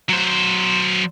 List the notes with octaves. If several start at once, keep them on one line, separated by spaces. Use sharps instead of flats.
F#3 C5